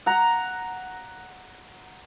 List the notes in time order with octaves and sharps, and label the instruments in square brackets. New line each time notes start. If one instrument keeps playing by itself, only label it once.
[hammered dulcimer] F#5 A#5